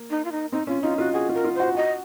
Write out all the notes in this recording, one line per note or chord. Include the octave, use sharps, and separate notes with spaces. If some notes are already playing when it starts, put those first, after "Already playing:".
Already playing: A#3
D#4
F4
D#4
C4 D#4
C#4 F4
D#4 F4
F4 F#4
F#4 G#4
F4
A#4
F4
F#4 C5
F#4 D#5